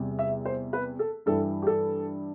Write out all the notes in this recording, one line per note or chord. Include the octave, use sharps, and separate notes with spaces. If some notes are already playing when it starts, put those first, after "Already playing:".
Already playing: E2 C3 G3
E5
C5
B4
A4
G2 E3 G3 A4
G4
A4